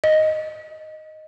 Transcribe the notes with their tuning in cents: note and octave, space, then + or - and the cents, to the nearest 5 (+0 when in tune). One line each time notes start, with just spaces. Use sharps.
D#5 +0